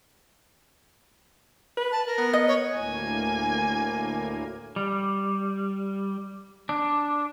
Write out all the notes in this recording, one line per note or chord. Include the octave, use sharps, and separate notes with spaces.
B4
A5
A#4
B3
D#5
C#5
D2 A2 A#3 G#5
G3
D4